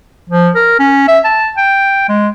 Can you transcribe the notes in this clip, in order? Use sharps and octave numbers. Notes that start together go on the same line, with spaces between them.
F3
A#4
C#4
E5
A5
G5
G#3